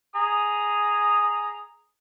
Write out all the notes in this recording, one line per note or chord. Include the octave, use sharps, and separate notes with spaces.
G#4 A#5 D#6